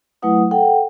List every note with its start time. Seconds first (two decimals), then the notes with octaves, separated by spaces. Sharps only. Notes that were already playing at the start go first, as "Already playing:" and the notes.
0.22 F#3 A3 E4 B4 F#5 D#6
0.51 A4 F#5 G5